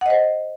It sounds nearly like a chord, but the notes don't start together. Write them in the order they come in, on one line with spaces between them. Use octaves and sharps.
F#5 D#5 C5